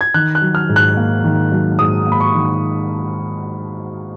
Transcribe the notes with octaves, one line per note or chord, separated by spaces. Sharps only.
G#6
D#3 F#6
F#6
F#3
F6
G#2
F#6
A#3
D#3
F#3
G#2 D#6
A#3
B5
C#6
D#3